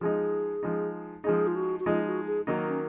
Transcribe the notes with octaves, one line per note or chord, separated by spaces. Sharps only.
F3 G#3 D#4 G#4
F3 G#3 D#4
F3 G#3 D#4 G#4
F4
F#4
F#4
F3 G#3 D#4 F4
F#4
G#4
D#3 F#3 A#3 D#4 F#4
C#4